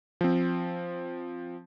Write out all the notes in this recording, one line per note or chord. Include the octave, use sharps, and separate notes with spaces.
F3 C4